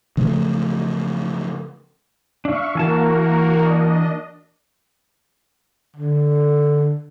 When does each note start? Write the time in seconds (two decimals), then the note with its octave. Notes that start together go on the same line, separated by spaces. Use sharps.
0.17 C#3 F3 A3
2.45 D4 E5 F5 C#6
2.75 E3 A#3 F#4 A#4 G#5 A5
3.63 D4 D#5
5.97 D3